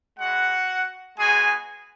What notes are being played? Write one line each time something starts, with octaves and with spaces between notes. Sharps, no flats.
G#3 E4 F#4 F#5
G#3 B3 F#4 G#4 G#5